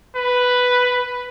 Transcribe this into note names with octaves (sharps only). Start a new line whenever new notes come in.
B4